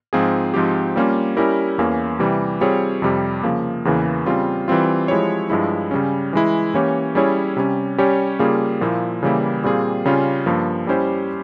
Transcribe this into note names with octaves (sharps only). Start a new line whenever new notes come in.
G#2 F3 C4 F4 G#4
G#2 F3 C4 G4
G3 A#3 C#4 F4
G3 C#4 E4 G4 A#4
E2 E3 A#3 C#4
C3 E3 G3
G3 C4 F4 G#4 C#5
F2 C3 G3
C#3 F3 A#3
E2 C#3 E3 A#3
C#3 G3 C4 F4
E3 G3 C4 F4
F3 G#3 E4 G4 C#5
G2 F3 G#3 E4
C#3 G3 C#4
E3 G#3 E4
E3 A#3 C#4 G4 C#5
G3 C#4 E4 G#4 C#5
C3 G3 C#4
G3 C#4 G4 C#5
C#3 G3 A#3 F4 G#4
A#2 F3 A#3 E4
C#3 E3 G3 A#3 E4
A#2 G3 C4 F4 G#4
C#3 G3 C#4 F4
G2 F3 A#3
G3 C#4 E4 G4 C5